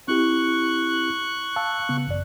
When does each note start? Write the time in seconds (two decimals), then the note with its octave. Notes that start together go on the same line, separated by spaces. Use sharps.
0.08 C4 E4 G4 C#6 F#6
1.56 F5 A5 E6
1.89 C#3 B3
2.07 A1 F#2 D5